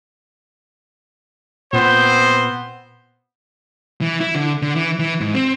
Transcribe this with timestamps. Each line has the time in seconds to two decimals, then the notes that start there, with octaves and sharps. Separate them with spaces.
1.73 A#2 B3 C4 C5
4.01 E3
4.20 E4
4.35 D3
4.62 D3
4.75 E3
4.99 E3
5.21 G#2
5.35 C4